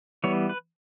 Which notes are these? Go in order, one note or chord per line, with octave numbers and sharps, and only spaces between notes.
E3 G3 B3 C#5
B4